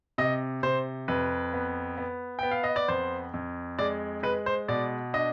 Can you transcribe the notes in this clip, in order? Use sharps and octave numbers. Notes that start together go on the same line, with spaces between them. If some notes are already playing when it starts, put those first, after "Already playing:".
C3 D#5
C3 C5
F2 B4
B3
B3
B3 G5
F5
D#5
D5
F2 C5
F2
G#3 D5
G#3 B4
C5
B2 D5
D4 D#5